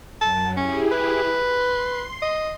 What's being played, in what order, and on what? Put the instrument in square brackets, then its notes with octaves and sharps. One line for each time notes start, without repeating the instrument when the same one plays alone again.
[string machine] F#2 F#3 [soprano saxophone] A5
[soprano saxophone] C#4 [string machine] E4 G4 G#4
[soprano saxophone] B4
[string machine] C6 C7
[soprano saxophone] D#5